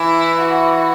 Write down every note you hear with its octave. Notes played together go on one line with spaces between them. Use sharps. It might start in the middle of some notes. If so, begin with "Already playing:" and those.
Already playing: E3 E4
F#4